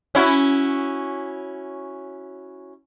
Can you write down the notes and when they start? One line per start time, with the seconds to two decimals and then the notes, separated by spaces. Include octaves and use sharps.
0.15 C#4 E4 F#4